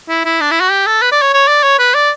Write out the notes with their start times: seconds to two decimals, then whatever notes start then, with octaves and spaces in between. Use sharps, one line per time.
0.09 E4
0.25 E4
0.41 D4
0.51 E4
0.61 F#4
0.71 G4
0.86 A4
1.02 B4
1.12 D5
1.22 C#5
1.33 C#5
1.48 D5
1.64 C#5
1.79 B4
1.94 D5